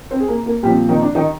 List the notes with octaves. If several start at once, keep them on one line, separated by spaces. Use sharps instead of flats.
C4 C5
G#4
A#3 A#4
A#3 A#4
A#2 F3 G3 C4 G4
D#3 D#4
D4
D#3 D#4